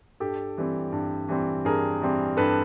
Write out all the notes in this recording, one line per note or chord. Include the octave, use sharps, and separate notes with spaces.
G2 G4 A4
E3 G3 C4
G2
E3 G3 C4
G2 G#4 A#4
E3 G3 C4
G2 A4 B4